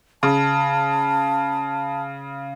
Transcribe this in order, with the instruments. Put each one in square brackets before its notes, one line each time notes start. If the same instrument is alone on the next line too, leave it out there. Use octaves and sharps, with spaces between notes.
[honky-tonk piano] C#3 [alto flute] A5